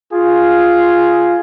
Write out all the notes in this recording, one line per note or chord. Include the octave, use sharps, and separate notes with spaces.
F4 G#4